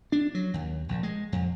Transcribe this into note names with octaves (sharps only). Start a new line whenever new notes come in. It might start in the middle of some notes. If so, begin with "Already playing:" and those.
D4
F#3
D#2
A#1
G#3
F2